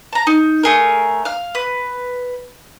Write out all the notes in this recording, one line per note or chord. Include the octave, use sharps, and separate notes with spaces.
A5 A#5
D#4
A3 G#4 A#4
F5 F6
B4